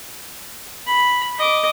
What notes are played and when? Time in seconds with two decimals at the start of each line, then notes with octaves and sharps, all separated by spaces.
0.87 B5
1.38 D#5 D6